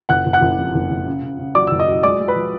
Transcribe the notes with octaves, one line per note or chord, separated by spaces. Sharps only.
F#1 F#5 F#6
F#1
F#5 F#6
F#1
F2
F#1
F#1
C#3
C#3
C#3
F#3 D5 D6
F#1 E6
D#5 D#6
F#3
G#3 D5 D6
G#3
B4 B5
F3